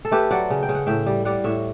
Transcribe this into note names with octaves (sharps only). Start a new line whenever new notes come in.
A4
A3 G4 B4
F#3 D5 F#5
C#3
G5
C#3
F#5
A2 E5 G5
G3
G3 D5 F#5
A2 C#5 E5